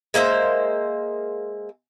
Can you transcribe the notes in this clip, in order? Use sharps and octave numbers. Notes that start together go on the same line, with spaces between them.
G#3 A#3 C5 E5